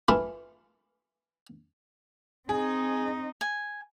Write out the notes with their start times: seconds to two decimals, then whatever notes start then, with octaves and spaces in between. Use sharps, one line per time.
0.08 E3 A3 E4 F4
2.49 C4 D#4 G#4
3.41 G#5